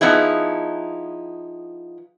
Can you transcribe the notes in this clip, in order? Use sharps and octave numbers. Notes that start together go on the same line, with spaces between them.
F3 B3 D#4 E4 G#4